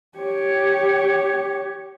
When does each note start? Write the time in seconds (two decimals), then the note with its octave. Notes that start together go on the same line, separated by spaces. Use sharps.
0.18 G4 C#5